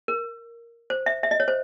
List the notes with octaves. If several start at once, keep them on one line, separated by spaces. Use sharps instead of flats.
A#4
C5
E5
E5
D#5
C#5
C5